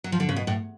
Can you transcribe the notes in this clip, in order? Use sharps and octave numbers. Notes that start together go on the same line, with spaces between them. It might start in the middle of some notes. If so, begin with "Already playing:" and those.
F#3
F3
D3
C#3
B2
A2